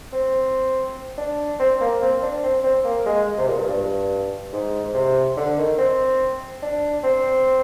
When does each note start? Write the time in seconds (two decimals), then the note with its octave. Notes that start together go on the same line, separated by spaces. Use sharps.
0.13 C4
1.18 D4
1.60 C4
1.81 A#3
2.02 C4
2.23 D4
2.44 C4
2.64 C4
2.85 A#3
3.06 G#3
3.38 C3
3.48 A#2
3.59 G2
3.69 G2
4.53 G#2
4.94 C3
5.37 D3
5.58 D#3
5.78 C4
6.63 D4
7.04 C4